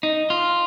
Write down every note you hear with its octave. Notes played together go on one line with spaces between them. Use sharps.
D#4
F4